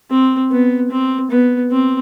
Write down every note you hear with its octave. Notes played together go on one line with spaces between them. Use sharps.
C4
B3
C4
B3
C4